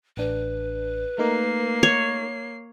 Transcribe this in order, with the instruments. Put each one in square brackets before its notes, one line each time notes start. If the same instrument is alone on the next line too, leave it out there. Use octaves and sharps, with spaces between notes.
[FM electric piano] A1 D4 [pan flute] B4
[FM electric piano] A3 D#4 A#4 [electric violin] A#3 C7
[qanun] C#5